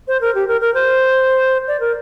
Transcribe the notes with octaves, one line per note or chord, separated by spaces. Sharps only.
C5
A#4
G4
A#4
A#4
C5
D5
A#4